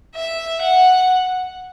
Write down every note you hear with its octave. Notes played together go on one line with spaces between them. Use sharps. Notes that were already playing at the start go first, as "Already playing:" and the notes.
E5
F#5